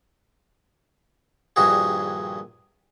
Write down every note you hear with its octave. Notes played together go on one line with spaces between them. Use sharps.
A#1 G2 D#3 D#4 F#4 G#4